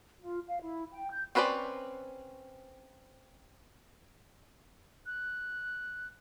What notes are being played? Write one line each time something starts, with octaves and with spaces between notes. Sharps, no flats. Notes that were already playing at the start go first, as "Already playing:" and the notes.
F4
F5
E4
G5
G6
C4 C#4 B4 C5 D5
F#6